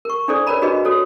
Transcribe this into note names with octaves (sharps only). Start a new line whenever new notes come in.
A#4 C#6
D4 E4 G#4 A4 C5 D5
A#4 B4 C#5 D5 A#5 B5
D4 F#4 G#4 A#4 B4 D#5
F#4 A4 C#5